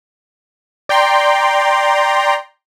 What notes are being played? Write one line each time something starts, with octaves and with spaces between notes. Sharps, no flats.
D5 G5 A#5 C6